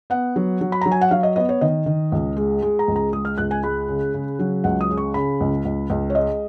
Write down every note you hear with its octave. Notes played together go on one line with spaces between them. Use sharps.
B3 F#5
F#3
F#3
B5
F#3 A#5
G#5
F#5
F#3 F5
D#5
B3 D#5
C#5
D#3 D#5
D#3
C#2
G#3
G#3
A#5
C#2
A#5
G#3 D#6
F6
C#2 F#6
G#5
G#3 B5
C#3
C#3
F#3
C#2 F#5
D#6
C#3
C#6
C#3 B5
C#2
C#2
C#2
C#5
G#3 D#5